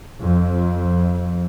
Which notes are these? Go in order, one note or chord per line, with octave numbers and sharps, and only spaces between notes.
F2